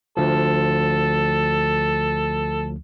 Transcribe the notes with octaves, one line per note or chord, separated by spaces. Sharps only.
D2 F3 A4